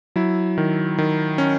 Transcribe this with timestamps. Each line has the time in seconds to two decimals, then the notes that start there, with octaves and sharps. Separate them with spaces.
0.16 F#3 E4
0.58 D#3
0.98 D#3
1.38 C#4